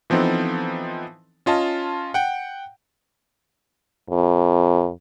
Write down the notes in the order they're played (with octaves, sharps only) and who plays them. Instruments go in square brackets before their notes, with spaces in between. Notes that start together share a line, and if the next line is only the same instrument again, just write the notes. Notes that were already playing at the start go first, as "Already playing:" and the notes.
[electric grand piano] E3 F3 B3 C4 D#4 A4
C#4 F4 D#5 A5
F#5 G5
[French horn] F2